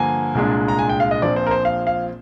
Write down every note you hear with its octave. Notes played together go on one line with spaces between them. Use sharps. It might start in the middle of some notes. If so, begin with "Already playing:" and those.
Already playing: G2 D3 F3 A#3 G#5
C2 A#2 G#3 D4
A#5
G#5
G5
F5
D#5
A#1 A#2 F3 C4 D5
C5
A#4
C5
F5
F5